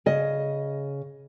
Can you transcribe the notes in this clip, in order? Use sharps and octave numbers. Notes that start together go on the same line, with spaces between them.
C#3 D#5